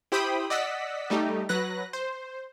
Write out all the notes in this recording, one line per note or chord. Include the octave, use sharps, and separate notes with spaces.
E4 G4 C5 G5 B5 D#6
D5 D#5 F#5 E6 B6
G3 A3 D#4 G4
F#3 B4 F#6 A#6
C5